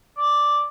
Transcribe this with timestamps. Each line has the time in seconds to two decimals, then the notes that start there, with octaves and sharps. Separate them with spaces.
0.17 D5